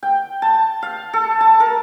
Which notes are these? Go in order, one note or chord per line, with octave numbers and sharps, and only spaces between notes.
G5
A5
F5
A4
A5
A#4